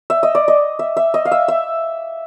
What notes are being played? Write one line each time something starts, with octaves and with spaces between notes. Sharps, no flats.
E5
D#5
D5
D#5
E5
E5
D#5
F5
E5
E5